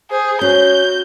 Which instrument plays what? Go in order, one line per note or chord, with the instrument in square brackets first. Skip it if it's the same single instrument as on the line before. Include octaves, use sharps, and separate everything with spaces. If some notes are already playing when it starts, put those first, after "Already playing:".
[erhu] G#4 [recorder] C5
[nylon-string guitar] C#4 [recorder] F#4 [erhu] G6